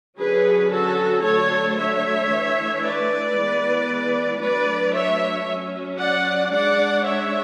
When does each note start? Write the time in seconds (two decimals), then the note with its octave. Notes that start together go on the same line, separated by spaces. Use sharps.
0.19 D3 F#3 C#4 G#4 B4
0.72 F#4 A4
1.24 D3 F#3 A3 A4 C#5
1.77 C#5 E5
2.30 E3 A3 D4
2.83 B4 D5
3.36 E3 G#3 B3
4.41 F#3 A3 D4 B4 D5
4.94 C#5 E5
5.47 F#3 C#4
5.99 D5 F#5
6.52 G#3 D4 D5 F#5
7.05 C#5 E5